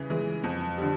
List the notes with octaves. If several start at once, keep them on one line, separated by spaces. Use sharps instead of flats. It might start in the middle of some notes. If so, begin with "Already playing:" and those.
Already playing: C#3 E3
E3 G#3
F2
D3 G3